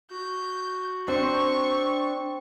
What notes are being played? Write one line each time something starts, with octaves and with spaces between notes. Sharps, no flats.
F#4 G6
C4 D4 C5 C#6